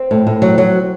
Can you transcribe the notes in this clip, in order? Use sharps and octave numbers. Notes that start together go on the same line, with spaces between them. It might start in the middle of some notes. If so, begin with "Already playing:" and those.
Already playing: C4
A2
A2
F#3
F#3